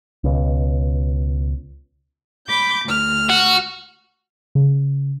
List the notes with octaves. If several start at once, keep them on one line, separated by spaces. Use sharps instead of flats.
C#2 B2
B5 D6 G6
D2 F6
F#4
C#3